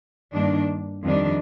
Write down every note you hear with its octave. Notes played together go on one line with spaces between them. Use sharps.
G2 D#3 A#3 D4
F2 D#3 G3 D4